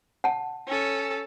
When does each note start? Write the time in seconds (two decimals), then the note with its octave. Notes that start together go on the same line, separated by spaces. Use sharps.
0.24 F#5 A5
0.68 C#4 A4